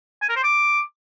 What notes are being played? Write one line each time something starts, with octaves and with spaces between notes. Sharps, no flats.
G#5
A#4
C5
D6